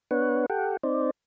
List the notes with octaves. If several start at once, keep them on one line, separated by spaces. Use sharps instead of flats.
B3 D4 B4 C#5 F#5
G4 A4 F#5 G5
C4 D#4 C5 D5